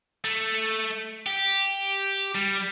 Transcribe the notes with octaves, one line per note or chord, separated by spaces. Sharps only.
A3
G4
G3